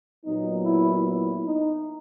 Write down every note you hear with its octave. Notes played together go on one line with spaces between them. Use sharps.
A#2 F#3 B3 D#4
E4
E4
D#4